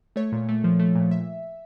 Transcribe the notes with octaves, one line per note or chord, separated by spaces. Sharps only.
A3 C#5
A#2
A3
F3
A3
A#2
E5